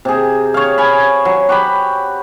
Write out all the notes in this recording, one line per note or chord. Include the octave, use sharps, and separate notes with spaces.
C3 G#4
C#5 F5
G#5 B5
F#3
F#4 G4 B5